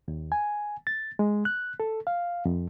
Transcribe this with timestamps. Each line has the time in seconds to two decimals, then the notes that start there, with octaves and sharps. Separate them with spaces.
0.08 D#2
0.32 G#5
0.87 A6
1.19 G#3
1.45 F#6
1.80 A4
2.07 F5
2.45 F2